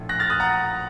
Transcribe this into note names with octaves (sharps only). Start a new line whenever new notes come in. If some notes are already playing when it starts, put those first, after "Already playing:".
Already playing: A#1 A2 F3
F#6 A#6
F6 A6
D#6 F#6
F#5 A#5